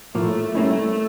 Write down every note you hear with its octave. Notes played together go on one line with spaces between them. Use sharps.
A2 F3 A3 A#3
G3 A3 A#3 C#4 E4